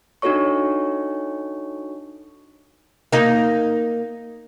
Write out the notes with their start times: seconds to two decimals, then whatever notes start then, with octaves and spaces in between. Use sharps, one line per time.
0.22 D4 D#4 F#4 A4 C#5 C#6
3.12 A#3 D#4